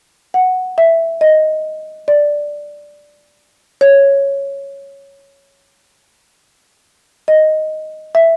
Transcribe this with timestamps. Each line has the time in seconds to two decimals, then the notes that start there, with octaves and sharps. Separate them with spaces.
0.34 F#5
0.78 E5
1.21 D#5
2.08 D5
3.81 C#5
7.28 D#5
8.15 E5